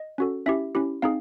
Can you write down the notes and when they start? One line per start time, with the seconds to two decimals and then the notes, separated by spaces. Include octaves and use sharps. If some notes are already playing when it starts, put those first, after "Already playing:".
Already playing: D#5
0.18 C#4 F#4 A4
0.46 C#4 E4 G4 E5
0.75 C#4 E4 G4
1.02 C4 D#4 G#4 F5